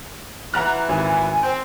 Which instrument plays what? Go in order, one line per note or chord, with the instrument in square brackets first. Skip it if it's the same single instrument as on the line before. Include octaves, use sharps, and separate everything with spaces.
[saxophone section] E3 [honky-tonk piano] F#5 A#5 F#6
[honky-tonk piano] G#1 [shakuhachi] G#5
[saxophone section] C4